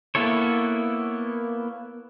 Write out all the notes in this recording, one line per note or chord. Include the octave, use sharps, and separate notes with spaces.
A#3 B3 E4 A4 C#5